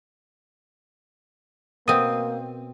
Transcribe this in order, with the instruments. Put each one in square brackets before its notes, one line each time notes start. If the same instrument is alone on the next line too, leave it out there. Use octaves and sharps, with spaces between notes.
[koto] B2 C4 [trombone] A#3 [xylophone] D#6 D#7